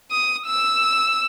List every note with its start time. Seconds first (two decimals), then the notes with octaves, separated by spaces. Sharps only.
0.11 D#6
0.47 E6